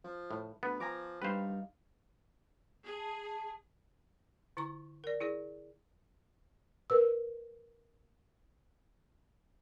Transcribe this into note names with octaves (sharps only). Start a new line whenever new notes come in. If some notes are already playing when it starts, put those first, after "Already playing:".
F3
A2
D2 B3
F3 G#5 A#5 D6
G2 G3 D#4 B4 C5 F5
G#4 A5
D3 E4 A#5 C#6
A#4 D5
E4 G#4 D5
A#4 B4 E6